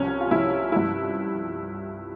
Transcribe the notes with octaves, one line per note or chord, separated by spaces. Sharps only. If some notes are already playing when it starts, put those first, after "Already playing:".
Already playing: C2 C3 F3 C#4
F4
C2 C3 F3 E4
G2 F3 E4